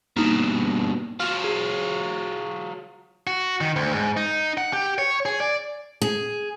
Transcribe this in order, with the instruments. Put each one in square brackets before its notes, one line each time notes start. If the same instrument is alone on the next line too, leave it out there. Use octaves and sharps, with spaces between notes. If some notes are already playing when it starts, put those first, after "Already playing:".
[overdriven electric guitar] G2 B2 [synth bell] A#3 D#4
[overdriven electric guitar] F#3 F4 [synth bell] F6
[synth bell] G#4
[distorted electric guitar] F#4
D#3
D2
G#2
D#4
F#5
G4
C#5
G#4
D5
[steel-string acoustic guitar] G#4